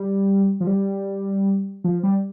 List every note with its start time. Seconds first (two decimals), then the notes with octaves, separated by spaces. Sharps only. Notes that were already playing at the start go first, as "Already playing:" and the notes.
Already playing: G3
0.60 F3
0.67 G3
1.84 F3
2.03 G3